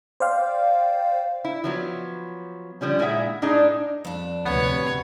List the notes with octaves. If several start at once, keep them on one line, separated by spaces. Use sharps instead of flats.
C5 D5 F5 G5
E4
F3 F#3 B3
D3 F3 G3 C#4
A#2 G#3 E4 G#4 E5 F#5
A2 D4 D#4 G#4 D#5
F2 D4
D2 A2 C3 B3 B4 C#5